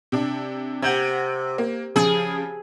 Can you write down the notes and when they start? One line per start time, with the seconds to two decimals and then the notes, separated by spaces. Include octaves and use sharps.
0.12 C3 D4
0.82 C3 F#5 G6 G#6
1.58 A#3
1.96 C#3 F3 G#4